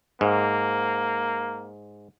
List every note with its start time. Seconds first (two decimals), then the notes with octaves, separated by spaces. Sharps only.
0.21 G#2 A#3